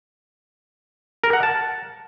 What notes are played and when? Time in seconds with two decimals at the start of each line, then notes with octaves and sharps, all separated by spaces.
1.24 A#4
1.33 F#5
1.43 A5